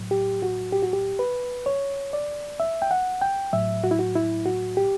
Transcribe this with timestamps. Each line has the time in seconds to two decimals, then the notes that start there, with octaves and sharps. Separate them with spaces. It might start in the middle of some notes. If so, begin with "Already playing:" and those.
Already playing: A2 F#3
0.11 G4
0.42 F#4
0.73 G4
0.83 F#4
0.93 G4
1.19 B4
1.66 C#5
2.13 D5
2.60 E5
2.82 G5
2.91 F#5
3.21 G5
3.53 A2 F#3 E5
3.84 F#4
3.91 E4
3.99 F#4
4.15 E4
4.46 F#4
4.77 G4